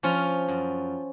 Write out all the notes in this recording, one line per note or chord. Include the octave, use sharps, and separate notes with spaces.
F3 C#4 F4
F#2